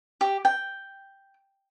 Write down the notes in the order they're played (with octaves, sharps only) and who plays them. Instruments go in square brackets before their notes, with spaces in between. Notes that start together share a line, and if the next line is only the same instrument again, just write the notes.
[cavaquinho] G4
G5